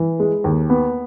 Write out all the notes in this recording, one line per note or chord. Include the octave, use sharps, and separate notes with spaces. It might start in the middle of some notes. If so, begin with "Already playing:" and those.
Already playing: E3
G#3
D#2
B3